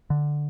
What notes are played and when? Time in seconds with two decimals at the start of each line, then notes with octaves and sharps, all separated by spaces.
0.10 D3